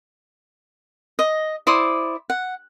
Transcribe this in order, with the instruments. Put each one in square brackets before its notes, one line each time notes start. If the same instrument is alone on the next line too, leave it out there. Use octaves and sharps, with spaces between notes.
[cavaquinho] D#5
E4 C5 D5 D#6
F#5